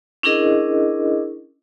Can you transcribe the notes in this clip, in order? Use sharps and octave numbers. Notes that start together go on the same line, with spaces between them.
C#4 D4 E4 G#4 A#4 D#5